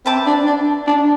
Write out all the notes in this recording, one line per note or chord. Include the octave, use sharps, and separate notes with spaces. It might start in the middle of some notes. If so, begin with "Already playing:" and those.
C4 B4 E5 A5 D6
D4
D4
D4